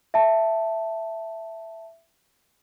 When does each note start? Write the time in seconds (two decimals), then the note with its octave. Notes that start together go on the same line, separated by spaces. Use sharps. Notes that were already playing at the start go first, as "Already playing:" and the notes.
0.14 E5 A5